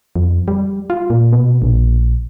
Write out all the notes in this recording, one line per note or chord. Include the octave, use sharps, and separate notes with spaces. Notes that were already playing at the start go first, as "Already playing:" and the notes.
F2
G3
F4
A#2
B2
A#1